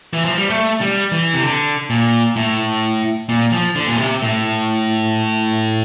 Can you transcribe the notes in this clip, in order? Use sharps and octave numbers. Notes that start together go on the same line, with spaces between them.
E3
F3
G3
A3
G3
E3
C3
D3
A#2
A2
A#2
F3
D3
A#2
C3
A2